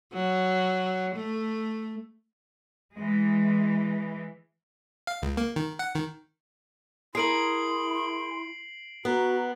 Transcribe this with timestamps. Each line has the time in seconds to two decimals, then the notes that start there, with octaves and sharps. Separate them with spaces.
0.14 F#3
1.15 A3
2.96 E3 G#3
5.07 F5
5.22 C#2
5.37 A#3
5.56 D#3
5.79 F#5
5.94 D#3
7.15 E4 G#4 A#4 C6 C7 D7 F#7
9.05 B3 F#4 A#5